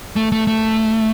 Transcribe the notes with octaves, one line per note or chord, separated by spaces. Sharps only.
A3
A3
A3